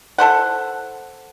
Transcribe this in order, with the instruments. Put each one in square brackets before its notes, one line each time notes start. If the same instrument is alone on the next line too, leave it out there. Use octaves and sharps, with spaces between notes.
[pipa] E4 A4 C5 F#5